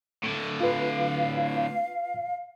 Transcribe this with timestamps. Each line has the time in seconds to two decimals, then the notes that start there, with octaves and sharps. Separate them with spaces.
0.23 A2 D3
0.61 F4 B4 F5